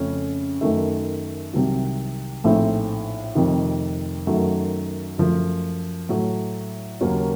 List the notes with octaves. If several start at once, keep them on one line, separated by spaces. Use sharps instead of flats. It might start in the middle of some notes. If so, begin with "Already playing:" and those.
Already playing: F2 C#3 A3 C#4
F#2 D#3 A3
C2 C3 D#3 F#3
A#1 A2 A3 C4 D#4
F1 F2 C3 D#3
F#2 D#3 F#3 A3
F#2 F3 A3
A2 F#3 A3
D#2 C#3 F#3 A#3 C#4